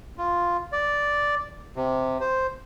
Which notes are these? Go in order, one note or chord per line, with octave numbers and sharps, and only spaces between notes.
F4
D5
C3
C5